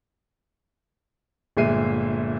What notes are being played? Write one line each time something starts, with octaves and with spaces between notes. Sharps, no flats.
G1 A#2 G#3 E5 C7 D#7